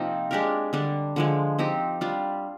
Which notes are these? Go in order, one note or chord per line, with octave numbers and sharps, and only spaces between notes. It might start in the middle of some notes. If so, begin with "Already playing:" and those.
Already playing: C3 F3 A#3 C4 D#4
G#3 D4 G4 A#4
D3 G3 D4
D3 F3 G#3
F3 C4 D#4 G4
G3 D4 F4